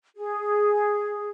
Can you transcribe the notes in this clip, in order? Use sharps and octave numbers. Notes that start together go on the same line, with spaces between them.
G#4